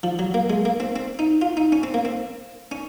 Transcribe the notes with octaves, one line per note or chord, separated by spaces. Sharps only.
F3
F#3
A#3
G#3
A#3
C4
C4
D#4
F4
D#4
C#4
C4
A#3
C4
C#4